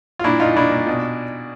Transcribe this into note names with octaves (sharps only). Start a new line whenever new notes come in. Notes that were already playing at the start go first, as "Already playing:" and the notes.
F4
A#2 D4 E4
A#2 D#4 F4
A#2 D4 E4
A#2
B2